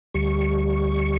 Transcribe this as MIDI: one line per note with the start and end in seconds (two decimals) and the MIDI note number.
0.14 1.17 38
0.14 1.17 55
0.14 1.17 85